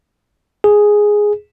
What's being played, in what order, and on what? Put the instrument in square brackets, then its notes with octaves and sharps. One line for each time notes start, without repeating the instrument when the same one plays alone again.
[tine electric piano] G#4